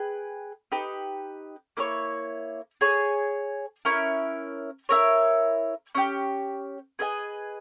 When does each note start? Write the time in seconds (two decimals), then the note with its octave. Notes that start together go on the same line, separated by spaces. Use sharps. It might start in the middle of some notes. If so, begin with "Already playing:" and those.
Already playing: G#4 B4 G5
0.72 D#4 G4 B4
1.77 A#3 E4 A#4 C#5
2.81 G#4 C#5 G#5
3.85 C#4 E4 A#4
4.89 E4 A#4 C#5
5.95 C#4 E4 G4
6.99 G#4 B4 D#5 G#5